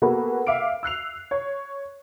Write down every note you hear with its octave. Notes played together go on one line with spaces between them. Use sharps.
A#3 B3 F#4 G#4 A4 B4
E5 F5 D6 D7
E6 F#6 C7 F7
C#5